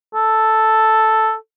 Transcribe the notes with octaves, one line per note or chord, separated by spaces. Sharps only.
A4